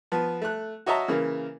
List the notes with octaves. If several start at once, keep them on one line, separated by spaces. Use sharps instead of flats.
F3 B3
A3 F#6
F#4 C#5 D#5 E5 A5 A#5
C#3 E3 A#3